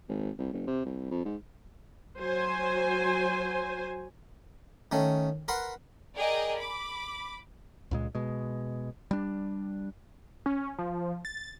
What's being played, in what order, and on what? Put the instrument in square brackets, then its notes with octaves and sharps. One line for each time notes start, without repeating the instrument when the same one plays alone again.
[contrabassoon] G#1
C2
F#1
C3
C2
F2
G#2
[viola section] F#3 C5 G#5
[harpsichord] D#3 A3 C#4
A#4 B4 F#5 B5 C6
[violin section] G#4 A#4 D5 D#5 G5
B5 D6
[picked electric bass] C#2 A#2 G#3
B2 G#3
G3 D4
[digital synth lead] C#4
F3
A6